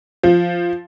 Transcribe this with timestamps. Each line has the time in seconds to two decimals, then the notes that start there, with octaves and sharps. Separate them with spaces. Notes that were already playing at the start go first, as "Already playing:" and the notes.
0.23 F3